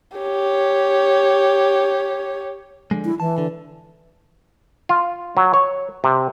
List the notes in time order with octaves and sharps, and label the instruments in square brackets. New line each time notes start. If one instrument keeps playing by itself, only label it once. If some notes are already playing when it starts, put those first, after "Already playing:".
[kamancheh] G4 C#5
[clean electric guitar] D3 F3 G#3
[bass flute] E4
[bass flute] E3 [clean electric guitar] A5
[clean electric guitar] D3
[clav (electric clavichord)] F4
F#3
C#5
C3